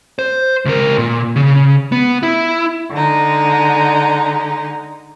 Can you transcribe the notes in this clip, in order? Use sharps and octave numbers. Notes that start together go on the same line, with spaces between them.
C5
C#2 A#4
A#2
C#3
B3
E4
D3 G#3 D#4